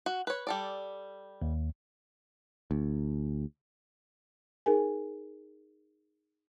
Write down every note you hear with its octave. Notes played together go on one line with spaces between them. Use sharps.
F#4
B4 C#5
G3 A4 D5
D#2
D2
D#4 G#4 A#4 G#5